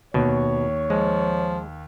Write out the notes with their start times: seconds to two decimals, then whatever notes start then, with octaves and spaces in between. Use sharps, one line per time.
0.14 D#2 B2 C#5
0.90 F3 G#3